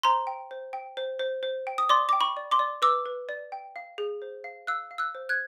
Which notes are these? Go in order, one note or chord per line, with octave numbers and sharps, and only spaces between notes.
C5 A#5 C6
G5
C5
G5
C5
C5
C5
G5
D#6
D5 C6 D6
G5 D6
B5 C#6
D5
C6 D6
D5
B4 D6 E6
B4
D5
G5
F5
G#4
C5
F5
F5 E6 F#6
F5
E6 F#6
C5
F#6 G#6